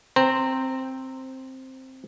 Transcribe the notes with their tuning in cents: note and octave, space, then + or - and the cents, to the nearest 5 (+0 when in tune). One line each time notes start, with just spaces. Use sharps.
C4 +5 C5 +0 A#5 -20